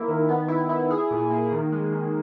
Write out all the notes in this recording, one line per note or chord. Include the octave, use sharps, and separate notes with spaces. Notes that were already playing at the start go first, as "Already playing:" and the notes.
Already playing: A#3 E4
D#3
B3
E4
E4
G#4
A#2
A#3
D#3
G#3
D#3